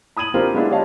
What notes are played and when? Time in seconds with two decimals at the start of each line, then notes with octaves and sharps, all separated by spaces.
0.17 B5 D#6 G#6 D#7 F#7
0.34 C4 D4 F4 G4 A#4
0.54 G#3 B3 D4 E4 F4
0.70 G4 C#5 D#5 F5 A5